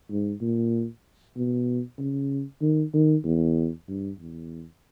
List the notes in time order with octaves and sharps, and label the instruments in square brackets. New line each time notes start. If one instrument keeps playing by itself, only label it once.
[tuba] G#2
A#2
B2
C#3
D#3
D#3
E2
G2
E2